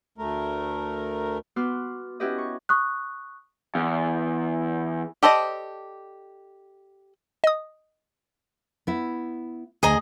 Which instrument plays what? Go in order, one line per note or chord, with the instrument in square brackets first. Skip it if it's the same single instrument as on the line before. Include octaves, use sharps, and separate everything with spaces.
[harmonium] D2 A3 A#4
[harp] B3 F#4 B4 C6 D6 F6
C#4 E4 F#4 G4 B4 D#5
C#6
[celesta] C#6 D#6 F#6
[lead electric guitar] E2
[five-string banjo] G4 A4 C5 D5 D#5
[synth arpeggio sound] D#5 D#6
[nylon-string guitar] B3 E4
[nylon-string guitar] D2 [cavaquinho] G#4 D#5 A#5